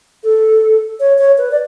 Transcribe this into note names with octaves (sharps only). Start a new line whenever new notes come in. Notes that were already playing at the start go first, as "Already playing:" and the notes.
A4
C#5
C#5
B4
D5